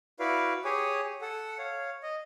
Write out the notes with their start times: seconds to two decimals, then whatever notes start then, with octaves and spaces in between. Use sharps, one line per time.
0.20 E4 F#4 B4 D5 F5
0.65 G4 G#4 C#5 G#5
1.21 A4 F#5
1.58 C#5 F5
2.03 D#5